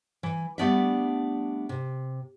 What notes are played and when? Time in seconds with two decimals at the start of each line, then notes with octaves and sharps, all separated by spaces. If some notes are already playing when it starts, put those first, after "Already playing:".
0.23 E3
0.58 G3 A3 B3 D4 D5 E5
1.69 C3